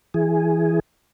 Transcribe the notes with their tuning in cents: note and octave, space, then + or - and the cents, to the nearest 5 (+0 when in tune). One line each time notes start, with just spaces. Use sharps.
E3 +5 G#4 +0